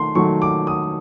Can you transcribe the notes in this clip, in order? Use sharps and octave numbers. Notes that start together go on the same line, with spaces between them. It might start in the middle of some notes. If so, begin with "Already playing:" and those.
Already playing: D#3 A3 C6
D#3 F#3 A3 C#6
D6
D#6